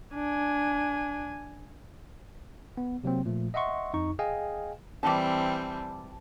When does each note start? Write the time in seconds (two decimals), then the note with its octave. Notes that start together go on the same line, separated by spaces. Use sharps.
0.14 D4 G#5
2.77 B3
3.04 C3 F#3 A#3 C4
3.26 A#2 F3 A3
3.54 D#5 E5 F#5 C6 C#6
3.94 F2 D#4 C#6
4.19 G#4 D#5 F5 G5 G#5
5.03 E3 G3 C4 A5 D6